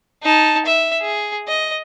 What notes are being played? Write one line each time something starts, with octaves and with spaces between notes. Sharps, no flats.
D#4 A5
E5
G#4
D#5